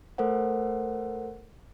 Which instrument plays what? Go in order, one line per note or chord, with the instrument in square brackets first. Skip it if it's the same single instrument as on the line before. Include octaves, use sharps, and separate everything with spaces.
[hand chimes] A3 A4 A#4 C5 F#5